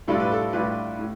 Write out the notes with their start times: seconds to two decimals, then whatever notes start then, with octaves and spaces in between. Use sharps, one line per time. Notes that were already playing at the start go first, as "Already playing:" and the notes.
0.07 A2 G3 D4 F4 A4
0.20 B4
0.32 A4
0.53 A2 G3 D4 F4 G4 B4
0.99 A2